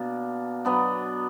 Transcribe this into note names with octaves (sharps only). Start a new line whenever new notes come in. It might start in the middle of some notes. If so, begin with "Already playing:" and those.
Already playing: B2 A#3 D4
F#3 B3 D4